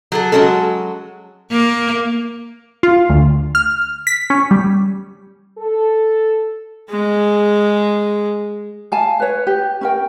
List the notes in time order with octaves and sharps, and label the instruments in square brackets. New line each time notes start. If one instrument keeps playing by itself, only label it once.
[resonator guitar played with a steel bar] F#3 G#4 A4
F#3 G#3 C#4 F#4 A4
[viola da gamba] A#3
[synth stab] F4
D2
F6
B6
C#4
G3
[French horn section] A4
[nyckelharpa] G#3 G#4
[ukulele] F5 G#5 A5
B4 C#5
G4
C#4 A#4 G5